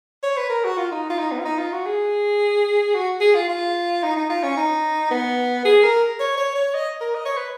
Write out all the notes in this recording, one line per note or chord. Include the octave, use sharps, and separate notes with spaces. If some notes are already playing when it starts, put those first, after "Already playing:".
C#5
B4
A#4
F#4
F4
D#4
F4
D#4
B3
F4
D#4
F4
F#4
G#4
F#4
G#4
F4
F4
D#4
D#4
F4
C#4
D#4
B3
G#4
A#4
C#5
C#5
C#5
D#5
A#4
D#5
C#5
B4